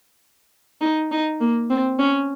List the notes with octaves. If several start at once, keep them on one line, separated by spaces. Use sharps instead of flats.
D#4
D#4
A#3
C4
C#4